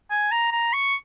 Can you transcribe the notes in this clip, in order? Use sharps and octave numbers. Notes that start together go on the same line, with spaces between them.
G#5
A#5
A#5
C#6